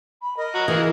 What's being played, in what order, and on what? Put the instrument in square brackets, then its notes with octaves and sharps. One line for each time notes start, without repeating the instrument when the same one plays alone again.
[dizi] B5
[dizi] A#4 [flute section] D#5
[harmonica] F#4 A#5
[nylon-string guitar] E3 [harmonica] A#3 G#4